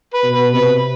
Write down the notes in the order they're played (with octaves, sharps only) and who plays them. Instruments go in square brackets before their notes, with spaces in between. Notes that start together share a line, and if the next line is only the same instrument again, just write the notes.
[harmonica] B4
[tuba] B2
[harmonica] B4
[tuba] C3 [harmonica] B4